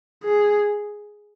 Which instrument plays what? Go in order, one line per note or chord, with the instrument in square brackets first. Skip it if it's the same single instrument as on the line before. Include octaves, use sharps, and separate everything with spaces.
[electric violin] G#4